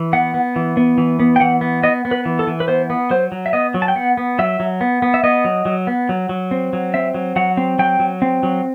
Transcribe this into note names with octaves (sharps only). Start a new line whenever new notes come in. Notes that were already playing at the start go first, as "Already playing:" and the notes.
Already playing: E3
B3 F#5
B3
E3
B3
E3
B3
G5
E3 F#5
B3
B3 D#5
B3
B4
E3
A4
E3
B4
B3 C5
B3
F#3 C5
F#3
E5
B3 D#5
F#3
A5
G5
B3 F#5
B3
F#3 E5
F#3
B3
B3
E5
B3 D#5
F#3
F#3
B3
F#3
F#3
C4
F#3
C4 E5
F#3
F#3 F#5
C4
F#3 G5
F#3
C4
F#3